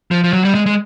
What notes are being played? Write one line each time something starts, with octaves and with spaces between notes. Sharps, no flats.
F3
F3
F#3
G3
G#3
G#3